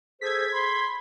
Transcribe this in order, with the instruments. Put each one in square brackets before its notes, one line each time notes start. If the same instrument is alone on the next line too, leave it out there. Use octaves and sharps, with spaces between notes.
[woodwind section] G#4 A4 C5 [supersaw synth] G#6 B6
[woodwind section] B5 C6